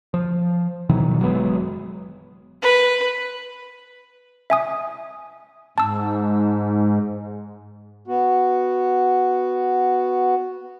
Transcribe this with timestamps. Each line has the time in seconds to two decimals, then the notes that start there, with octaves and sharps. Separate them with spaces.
0.14 F3
0.89 B2 D#3 E3 F#3
1.20 F#1 F#3 G#3 B3
2.62 B4
4.50 E5 G#5 D#6
5.78 G#2 A5 E6
8.07 B3 F#4